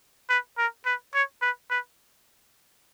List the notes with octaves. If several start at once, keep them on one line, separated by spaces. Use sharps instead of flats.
B4
A#4
B4
C#5
B4
B4